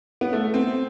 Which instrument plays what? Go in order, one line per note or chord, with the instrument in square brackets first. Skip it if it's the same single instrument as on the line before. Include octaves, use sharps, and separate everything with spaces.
[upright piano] B3
A3
C4